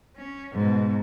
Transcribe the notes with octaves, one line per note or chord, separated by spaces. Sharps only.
C#4
G#2 B2